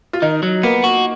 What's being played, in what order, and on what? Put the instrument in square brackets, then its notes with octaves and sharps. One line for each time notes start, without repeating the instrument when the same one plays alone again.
[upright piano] F4
[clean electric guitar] D#3 [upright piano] D#4
[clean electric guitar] F#3
[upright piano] A#3 [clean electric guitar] B3
[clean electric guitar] F#4